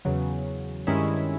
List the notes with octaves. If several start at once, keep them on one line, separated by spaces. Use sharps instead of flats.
E2 C#3 F#3
G2 D#3 G#3 C#4 E4